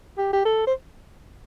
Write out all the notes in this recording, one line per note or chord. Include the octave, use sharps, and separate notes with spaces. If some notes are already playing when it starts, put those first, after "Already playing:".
G4
G4
A4
C5